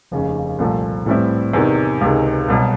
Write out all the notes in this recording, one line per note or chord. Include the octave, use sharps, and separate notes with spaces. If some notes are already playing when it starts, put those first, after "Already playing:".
F1 D#2 C#3
C2 A#2 F3 A3
A2 E3 G3 C4 E4
E2 C3 D#3
C#2 C3 D#3 G#3
C2 B2 F#3